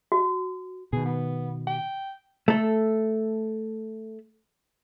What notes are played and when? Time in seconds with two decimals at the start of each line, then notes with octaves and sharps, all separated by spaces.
0.12 F#4
0.93 B2 D#3 G#4
1.05 B3
1.67 G5
2.48 A3 A4